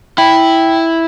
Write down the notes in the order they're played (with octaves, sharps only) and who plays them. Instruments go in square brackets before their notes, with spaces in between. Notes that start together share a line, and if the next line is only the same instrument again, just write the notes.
[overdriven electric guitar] E4 [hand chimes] G5 B5